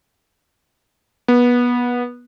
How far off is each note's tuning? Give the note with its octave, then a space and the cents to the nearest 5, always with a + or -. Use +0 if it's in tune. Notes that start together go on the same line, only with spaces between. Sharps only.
B3 -20